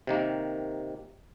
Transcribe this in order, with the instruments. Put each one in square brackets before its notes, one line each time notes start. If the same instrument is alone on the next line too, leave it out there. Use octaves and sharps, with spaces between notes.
[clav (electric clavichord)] C3 D#3 A#3